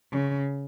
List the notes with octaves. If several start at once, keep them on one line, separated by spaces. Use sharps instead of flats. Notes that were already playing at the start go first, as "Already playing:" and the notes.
C#3